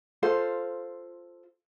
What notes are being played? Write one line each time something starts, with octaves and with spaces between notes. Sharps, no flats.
F4 A4 C5 F5